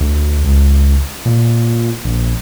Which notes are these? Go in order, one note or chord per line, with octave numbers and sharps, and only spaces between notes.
D2
C#2
A#2
A#1